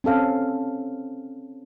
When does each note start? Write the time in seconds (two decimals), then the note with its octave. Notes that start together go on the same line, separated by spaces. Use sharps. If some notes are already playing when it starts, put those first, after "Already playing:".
0.04 C4 C#4 A4 F5